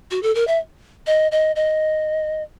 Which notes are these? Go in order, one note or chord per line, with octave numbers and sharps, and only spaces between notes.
F#4
A4
A#4
E5
D#5
D#5
D#5